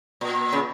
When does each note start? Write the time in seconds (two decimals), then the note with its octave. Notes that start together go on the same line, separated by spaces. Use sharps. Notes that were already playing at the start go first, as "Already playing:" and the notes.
0.21 A#2
0.52 C#3